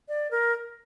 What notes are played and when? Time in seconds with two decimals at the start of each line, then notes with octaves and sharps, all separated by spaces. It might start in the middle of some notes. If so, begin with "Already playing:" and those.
0.09 D5
0.31 A#4